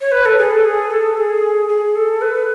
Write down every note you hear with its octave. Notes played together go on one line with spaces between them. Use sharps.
C#5
B4
A4
G#4
A4
G#4
A4
G#4
G#4
A4
B4